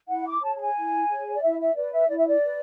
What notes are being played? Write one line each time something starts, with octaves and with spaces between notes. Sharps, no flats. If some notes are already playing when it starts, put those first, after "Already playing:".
E4 F#5
D6
G#4 C#5 A5
A5
G#5
E4
G#4 C#5
C#5
D5
E4 E5
E5
B4 D5
E5
E4 D5
E5
D5
B4